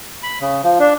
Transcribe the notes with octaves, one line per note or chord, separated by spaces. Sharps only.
B5
C#3
F3
D4